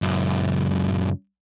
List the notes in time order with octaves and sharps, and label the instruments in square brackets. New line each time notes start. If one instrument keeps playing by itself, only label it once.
[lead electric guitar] C#2 F#2